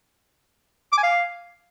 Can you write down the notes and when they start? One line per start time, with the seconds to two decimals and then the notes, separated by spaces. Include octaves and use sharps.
0.92 D6
0.98 G#5
1.03 F5